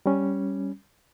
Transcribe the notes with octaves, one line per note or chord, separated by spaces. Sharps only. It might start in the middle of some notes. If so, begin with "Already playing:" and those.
G3 C#4